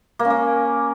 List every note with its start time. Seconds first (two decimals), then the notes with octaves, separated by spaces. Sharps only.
0.19 A#3
0.25 C#4
0.30 A#3